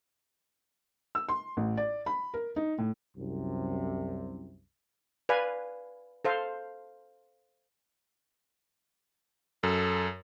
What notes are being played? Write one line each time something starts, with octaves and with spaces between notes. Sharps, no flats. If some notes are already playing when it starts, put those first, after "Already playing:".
E6
C6
A1
D5
B5
A#4
D#4
A2
C2 F#2 C3
B4 D5 F5 G#5
A4 C5 F5
F#2 A4